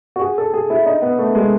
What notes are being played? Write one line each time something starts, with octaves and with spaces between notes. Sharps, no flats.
F#4
G#4
A4
G#4
E4
D#4
B3
A3
G#3